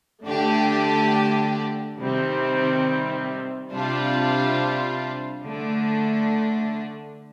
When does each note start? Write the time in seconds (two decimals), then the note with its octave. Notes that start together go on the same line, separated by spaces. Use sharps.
0.24 D3 A3 D4 G4
1.97 C3 D#3 G3 C4
3.71 C3 G3 D4 F4
5.43 D3 A3 D4